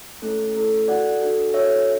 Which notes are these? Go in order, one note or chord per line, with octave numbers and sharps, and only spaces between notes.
A3 C#4 E4 A4
A3 C#4 E4 A4
D4 F#4 A4 D5 F#5
D4 F#4 A4
D4 F#4 A4 C#5 E5